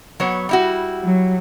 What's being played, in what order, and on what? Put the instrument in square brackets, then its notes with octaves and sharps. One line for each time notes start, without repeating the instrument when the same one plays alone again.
[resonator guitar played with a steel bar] F#3 B3 C#5
G3 E4 F#4
[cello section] F#3